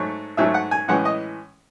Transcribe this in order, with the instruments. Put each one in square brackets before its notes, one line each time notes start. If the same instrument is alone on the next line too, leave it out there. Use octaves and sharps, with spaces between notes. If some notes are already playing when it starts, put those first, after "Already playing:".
Already playing: [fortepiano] G#2 F#3 A3 C#5
G#2 F#3 A3 E5
F#5
G#5
A2 E3 G#3 C#4 F#5
D#5